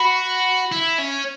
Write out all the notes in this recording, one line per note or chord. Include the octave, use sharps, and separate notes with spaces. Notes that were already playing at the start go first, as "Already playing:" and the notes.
Already playing: F#4 B5
E4
C#4